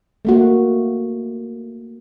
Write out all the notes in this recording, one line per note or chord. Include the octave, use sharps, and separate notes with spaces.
A3 A#3 F#4